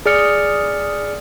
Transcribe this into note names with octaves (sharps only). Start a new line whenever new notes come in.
G#4 D5 F6 C#7